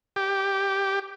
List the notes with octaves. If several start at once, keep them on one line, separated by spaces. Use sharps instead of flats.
G4